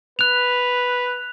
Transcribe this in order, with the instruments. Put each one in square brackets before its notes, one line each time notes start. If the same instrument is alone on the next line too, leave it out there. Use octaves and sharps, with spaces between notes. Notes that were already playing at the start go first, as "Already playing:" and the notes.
[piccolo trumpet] B4 [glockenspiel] F#6 F7